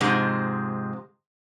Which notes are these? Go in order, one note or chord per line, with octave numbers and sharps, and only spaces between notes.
G#2 C3 F3 G#3